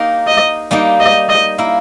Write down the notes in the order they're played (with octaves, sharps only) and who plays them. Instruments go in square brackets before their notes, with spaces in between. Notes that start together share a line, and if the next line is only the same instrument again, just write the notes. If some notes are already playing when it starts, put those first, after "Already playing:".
Already playing: [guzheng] A#3 D#4 G4 A#4
[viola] D#5
[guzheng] G3 A#3 D#4 G4
[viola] D#5
D#5
[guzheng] A#3 E4 A#4